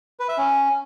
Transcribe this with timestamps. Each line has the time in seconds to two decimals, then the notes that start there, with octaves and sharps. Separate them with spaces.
0.20 B4
0.29 E5
0.38 C#4